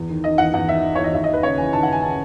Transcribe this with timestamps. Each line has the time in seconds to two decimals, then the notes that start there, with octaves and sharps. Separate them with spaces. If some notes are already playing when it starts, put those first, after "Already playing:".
Already playing: E2
0.09 D#3
0.24 D#3 D#5
0.38 E2 F#5
0.54 E2 F#5
0.69 D#3 E5
0.83 D#3
0.95 E2 C#5
1.04 D#5
1.13 D#2 E5
1.24 D#5
1.28 D#2
1.33 B4
1.43 C#3 C#5
1.58 E3 G#5
1.73 D#2 A5
1.83 F#5
1.88 D#2 G#5
2.03 C#3 A5